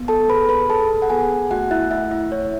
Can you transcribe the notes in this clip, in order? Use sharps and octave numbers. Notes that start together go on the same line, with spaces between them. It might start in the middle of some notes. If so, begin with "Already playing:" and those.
Already playing: B3
A4 A5
G#4 B4 B5
B4 B5
G#4 A4 A5
F#5
B3 G#4 G#5
A3 F#4 F#5
E4 E5
A3 E4 E5
E4 E5
E4 C#5